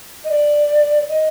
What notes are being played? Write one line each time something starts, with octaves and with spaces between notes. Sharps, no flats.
D#5
D5
D#5